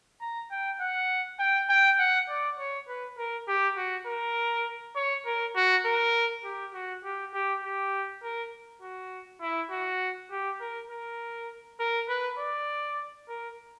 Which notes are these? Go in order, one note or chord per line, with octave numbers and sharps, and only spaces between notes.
A#5
G5
F#5
G5
G5
F#5
D5
C#5
B4
A#4
G4
F#4
A#4
C#5
A#4
F#4
A#4
G4
F#4
G4
G4
G4
A#4
F#4
E4
F#4
G4
A#4
A#4
A#4
B4
D5
A#4